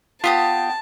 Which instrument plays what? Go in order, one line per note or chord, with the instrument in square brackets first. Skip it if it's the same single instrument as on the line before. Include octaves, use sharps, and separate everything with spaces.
[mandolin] B3 G4 D#6 [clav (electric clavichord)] F4 [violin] A5